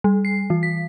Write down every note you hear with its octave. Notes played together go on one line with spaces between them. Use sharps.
G3
C7
E3
B6